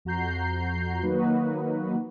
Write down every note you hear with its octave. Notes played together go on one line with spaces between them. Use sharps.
F2 F#4 A#5 G6 C7
D#3 F#3 A#3 D#4 F#4 B4